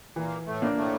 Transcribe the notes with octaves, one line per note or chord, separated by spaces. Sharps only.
A#2 E3 A#3
A2 A3
A#3 D4
A2 A3